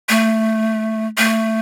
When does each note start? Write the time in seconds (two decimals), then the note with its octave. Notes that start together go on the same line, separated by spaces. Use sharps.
0.09 A3
1.18 A3